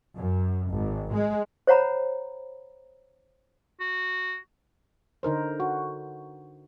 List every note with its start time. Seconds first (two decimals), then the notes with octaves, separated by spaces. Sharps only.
0.17 F#2
0.72 G#1
1.13 G#3
1.67 C5 C#5 F#5 A#5 B5
3.80 F#4
5.23 D3 D#4 A#4 C5
5.60 F#4